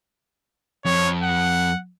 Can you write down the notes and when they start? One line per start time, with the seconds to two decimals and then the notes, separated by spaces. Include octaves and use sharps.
0.85 F2 C#5
1.23 F#5